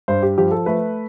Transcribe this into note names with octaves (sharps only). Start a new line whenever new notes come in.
G2 C5
G4
F3 G4
A4
A3 B4